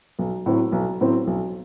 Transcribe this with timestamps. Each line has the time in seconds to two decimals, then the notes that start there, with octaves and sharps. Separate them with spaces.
0.19 B1
0.46 A2 F#3 C4
0.72 B1
1.01 A2 F#3 C4
1.27 B1